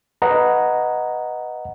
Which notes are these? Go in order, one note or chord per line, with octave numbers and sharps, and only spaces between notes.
B4 D#5 F#5 A#5